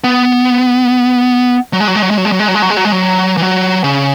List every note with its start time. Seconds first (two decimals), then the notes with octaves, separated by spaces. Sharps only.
0.04 B3
1.73 F#3
1.80 G#3
1.88 F#3
1.95 G#3
2.02 F#3
2.11 G#3
2.18 F#3
2.25 G#3
2.32 F#3
2.39 G#3
2.48 F#3
2.55 G#3
2.62 F#3
2.70 G#3
2.77 F#3
2.85 G#3
2.92 F#3
3.37 E3
3.42 F#3
3.84 C#3